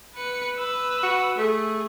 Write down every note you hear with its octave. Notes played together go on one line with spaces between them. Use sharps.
B4 C#7
B4 E6
F#4
A3 G#4